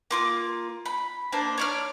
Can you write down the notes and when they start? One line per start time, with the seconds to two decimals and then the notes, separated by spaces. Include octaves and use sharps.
0.11 A#3 F4 D6
0.86 B5
1.32 A#3 D4 C5
1.58 C#5 D5 F6